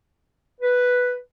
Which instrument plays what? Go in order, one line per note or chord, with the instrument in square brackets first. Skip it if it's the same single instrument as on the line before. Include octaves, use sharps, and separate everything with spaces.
[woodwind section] B4